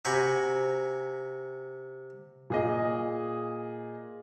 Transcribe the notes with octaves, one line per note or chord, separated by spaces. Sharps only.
C3 F#4 G5 G#5 A#5 B5
A#2 G#4 D#5